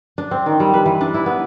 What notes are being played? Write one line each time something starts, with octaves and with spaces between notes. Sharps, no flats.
D4
C4
D#3
G3
B4
E3
D4
E4
B3